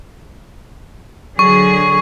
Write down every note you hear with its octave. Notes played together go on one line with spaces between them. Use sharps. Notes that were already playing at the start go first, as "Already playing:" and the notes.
D3 F#3 G#4 C#6